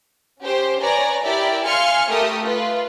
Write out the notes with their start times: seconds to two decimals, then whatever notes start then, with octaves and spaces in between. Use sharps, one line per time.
0.42 C#4 G4 C5
0.81 B4 C#5 D5 G#5 A#5
1.24 E4 G4 A#4 D5 E5
1.65 F5 G#5 C6 F6 C#7
2.09 A3 G4 A#4 D#6
2.45 F4 B4